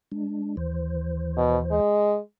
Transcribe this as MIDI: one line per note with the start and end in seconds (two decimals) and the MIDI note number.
0.12 0.56 56
0.12 0.56 62
0.57 1.80 39
0.57 1.80 52
0.57 1.80 72
1.37 1.58 47
1.71 2.18 56